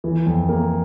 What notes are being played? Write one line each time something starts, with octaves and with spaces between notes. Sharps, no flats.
E3
F2
A#3